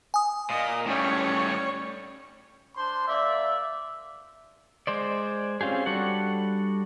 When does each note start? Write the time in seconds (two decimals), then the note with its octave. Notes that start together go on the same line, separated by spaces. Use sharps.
0.14 G#5 D#6
0.50 A#2 D#5
0.86 A2 G3 C#4 C#5
2.76 D4 C5 C6
3.07 A#3 D5 E5
4.87 G#3 C5 D5
5.61 C4 C#4 F4 G4 G#4
5.86 G3 D4 F#4 A4 F#5